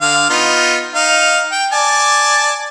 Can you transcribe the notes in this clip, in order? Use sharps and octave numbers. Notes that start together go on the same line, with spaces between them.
D3 F5
B3 D#4 F4
D#4 F5
G5
D5 G#5 A5